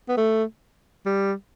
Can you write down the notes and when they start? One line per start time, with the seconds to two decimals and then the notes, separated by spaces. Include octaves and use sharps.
0.09 B3
0.17 A3
1.06 G3